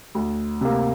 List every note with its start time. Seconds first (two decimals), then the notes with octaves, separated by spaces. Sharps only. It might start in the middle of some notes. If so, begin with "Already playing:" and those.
0.15 D2
0.61 C3 A#3